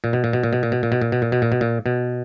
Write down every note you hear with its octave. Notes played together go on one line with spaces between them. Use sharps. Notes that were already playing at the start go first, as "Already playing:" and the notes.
A#2
B2
A#2
B2
A#2
B2
A#2
B2
A#2
B2
A#2
B2
A#2
B2
A#2
B2
A#2
B2